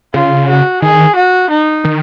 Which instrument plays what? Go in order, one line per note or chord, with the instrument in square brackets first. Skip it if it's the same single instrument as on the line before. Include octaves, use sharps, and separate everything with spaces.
[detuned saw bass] C#3 [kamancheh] F4
[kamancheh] F#4
[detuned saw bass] D#3 [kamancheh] G#4
[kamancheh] F#4
D#4
[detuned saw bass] D#3